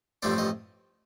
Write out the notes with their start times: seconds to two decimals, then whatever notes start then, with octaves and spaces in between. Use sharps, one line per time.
0.22 A1 G2 F3 A3 C4 D5
0.38 D#5